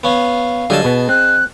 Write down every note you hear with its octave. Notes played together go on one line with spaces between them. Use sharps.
B3 C#4 F5
D3 F#3 G3 G#4 D#5 A5
B2 B3
C4 F#6